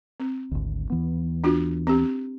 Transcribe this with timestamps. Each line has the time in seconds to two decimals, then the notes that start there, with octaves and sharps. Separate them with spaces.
0.20 C4
0.52 G#1 D2
0.90 D#2 E3 B3
1.44 D4 F4 F#4
1.87 C4 G4